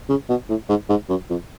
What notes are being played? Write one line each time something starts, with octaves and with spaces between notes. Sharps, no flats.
C#3
B2
A2
G#2
G#2
F#2
F2